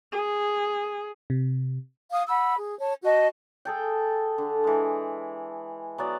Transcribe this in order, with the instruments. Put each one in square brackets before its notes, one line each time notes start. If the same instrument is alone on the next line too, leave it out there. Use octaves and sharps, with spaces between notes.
[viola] G#4
[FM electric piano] C3
[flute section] F5 D#6
F#5 B5 E6
G#4
C#5 A5
F#4 D#5 A5
[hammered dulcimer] G#4 A4 G5
D3
E3 G#3
F#3 B3 D5